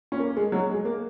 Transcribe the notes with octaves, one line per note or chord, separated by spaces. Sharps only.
C#4
A#3
G#3
F#3
G#3
A#3